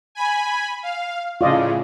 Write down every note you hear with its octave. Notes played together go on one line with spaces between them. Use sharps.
G#5 B5
F5
A2 C#3 F4 D5 D#5